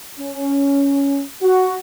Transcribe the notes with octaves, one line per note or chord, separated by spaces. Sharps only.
C#4
F#4